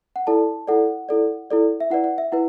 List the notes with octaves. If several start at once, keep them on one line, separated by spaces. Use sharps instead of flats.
F#5
E4 A4 D5 A5
E4 A4 D5 F#5
E4 A4 D5
E4 A4 D5
E5
E4 B4 D5 F#5
F#5
E5
E4 B4 F#5